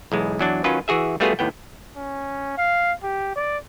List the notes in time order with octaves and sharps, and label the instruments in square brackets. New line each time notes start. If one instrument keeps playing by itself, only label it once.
[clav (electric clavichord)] B1 E2 G#3
E2 F#3 D4
D#3 F#3 C#4 F4 B4
E3 F#4 G#4 E5
G3 A3 B3 F4 F#4 G#4
D#2 A2 B3 G5
[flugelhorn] C#4
F5
G4
D5